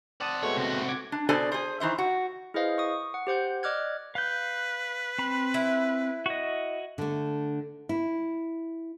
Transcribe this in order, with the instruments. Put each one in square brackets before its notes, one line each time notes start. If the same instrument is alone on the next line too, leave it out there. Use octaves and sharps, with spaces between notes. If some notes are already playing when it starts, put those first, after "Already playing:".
[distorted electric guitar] C4 F#5 [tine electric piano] D5 A5 D#6
[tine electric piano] B2 G#3 A3 [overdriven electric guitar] C#5
[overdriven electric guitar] C3 F#4
[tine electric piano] D6 G#6
[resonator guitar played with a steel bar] D4
B2 D4 A4 C5 D5 G#5
G#4 C5
D#3 E3 C5 E5
F#4
[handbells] E4 G#4 B4 C5 D#5 F5
C#6 D#6
F#5
G4 C5 F#5 G6
D5 D#5 D6 F6 F#6 G#6
[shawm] B4 [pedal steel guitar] F5 G6
[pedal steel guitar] C4 B5
[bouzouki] E4
[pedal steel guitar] F#4 D#5
[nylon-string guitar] D3 A3
E4